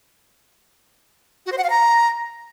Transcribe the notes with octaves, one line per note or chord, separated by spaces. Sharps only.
F#4
C5
F#5
F5
A#5